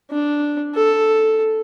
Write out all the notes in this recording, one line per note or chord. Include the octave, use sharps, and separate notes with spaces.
D4
A4